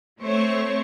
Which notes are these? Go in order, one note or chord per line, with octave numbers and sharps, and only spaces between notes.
A3 C4 C5 C#5 C#6